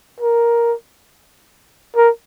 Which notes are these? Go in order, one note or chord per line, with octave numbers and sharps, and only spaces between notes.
A#4
A#4